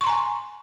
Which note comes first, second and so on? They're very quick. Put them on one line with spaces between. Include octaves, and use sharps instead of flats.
C#6 C6 A#5 G#5